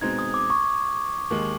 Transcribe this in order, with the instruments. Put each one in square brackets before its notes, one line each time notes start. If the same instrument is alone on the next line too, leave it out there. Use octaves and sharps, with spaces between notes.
[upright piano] B2 G#3 C4 D#4 [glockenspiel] G#6
[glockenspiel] D#6
D6
C#6
[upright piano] D#2 D#3 G#3